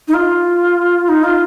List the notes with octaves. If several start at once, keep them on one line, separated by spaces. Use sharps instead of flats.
D#4
F4
D#4
F4